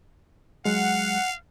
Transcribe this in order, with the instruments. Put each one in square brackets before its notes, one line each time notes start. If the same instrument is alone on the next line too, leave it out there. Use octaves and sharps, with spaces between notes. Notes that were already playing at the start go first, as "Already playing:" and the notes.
[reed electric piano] F#3 G#3 [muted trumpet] F5 [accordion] F#5